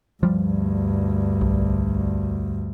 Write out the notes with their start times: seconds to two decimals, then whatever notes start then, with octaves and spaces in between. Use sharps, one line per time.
0.23 D2 G2 F3 G3
1.41 B1